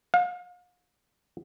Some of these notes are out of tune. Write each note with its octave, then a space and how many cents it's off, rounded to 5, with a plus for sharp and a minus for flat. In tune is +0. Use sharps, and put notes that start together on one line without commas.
F5 +40